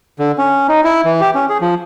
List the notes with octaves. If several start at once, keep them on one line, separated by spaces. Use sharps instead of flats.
D3
C#4
D#4
E4
E3
G4
C#4
G#4
F3